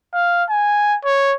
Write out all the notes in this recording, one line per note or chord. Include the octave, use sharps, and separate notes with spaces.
F5
G#5
C#5